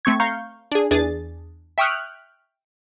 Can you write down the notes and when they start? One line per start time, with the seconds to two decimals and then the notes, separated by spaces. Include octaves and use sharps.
0.05 A3 C4 C#6 G#6
0.20 F5 A#5 C#6 G6
0.72 D4 G#4
0.91 E2 D4 G#4 A6
1.78 E5 G5 C#6 D#6 F6 F#6